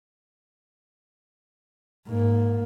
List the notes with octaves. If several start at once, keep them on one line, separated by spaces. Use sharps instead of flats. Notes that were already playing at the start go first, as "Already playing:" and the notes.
G#2 A#3